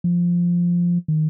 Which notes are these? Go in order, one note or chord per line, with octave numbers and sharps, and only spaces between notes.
F3
D#3